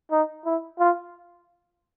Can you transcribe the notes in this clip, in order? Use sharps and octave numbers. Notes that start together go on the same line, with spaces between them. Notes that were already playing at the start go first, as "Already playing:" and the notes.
D#4
E4
F4